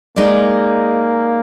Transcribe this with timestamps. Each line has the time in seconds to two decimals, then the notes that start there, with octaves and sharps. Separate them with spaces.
0.16 G#3 A#3 D#4 G#4 D5